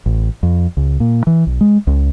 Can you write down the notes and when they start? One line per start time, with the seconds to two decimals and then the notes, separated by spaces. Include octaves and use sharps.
0.06 A1
0.43 F2
0.77 C#2
1.00 A#2
1.27 E3
1.47 B1
1.61 G#3
1.87 C#2